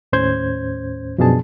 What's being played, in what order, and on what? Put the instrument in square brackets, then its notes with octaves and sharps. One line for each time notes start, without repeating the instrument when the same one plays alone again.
[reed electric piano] D#2 A2 C#4 C5 G6 G#6
F#2 B2 F3 D4 G#4 A5